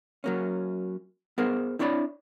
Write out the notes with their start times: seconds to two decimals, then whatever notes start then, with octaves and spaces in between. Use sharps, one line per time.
0.24 F#3 A#3 C#4
1.38 B3 G#4 A#4 C5
1.79 C4 D4 E4 C#5 D5 B5